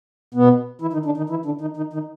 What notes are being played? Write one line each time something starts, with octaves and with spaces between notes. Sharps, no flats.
B2 B3
E3 E4
D#3 D#4
D3 D4
D#3 D#4
E3 E4
D3 D4
D#3 D#4
D#3 D#4
D#3 D#4